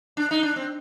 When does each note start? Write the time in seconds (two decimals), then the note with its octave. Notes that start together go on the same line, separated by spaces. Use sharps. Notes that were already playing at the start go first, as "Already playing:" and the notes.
0.17 D4
0.31 D#4
0.43 D4
0.56 C4